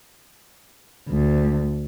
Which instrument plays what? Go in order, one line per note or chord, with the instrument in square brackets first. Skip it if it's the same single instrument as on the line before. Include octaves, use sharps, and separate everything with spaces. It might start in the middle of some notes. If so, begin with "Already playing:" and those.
[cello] D2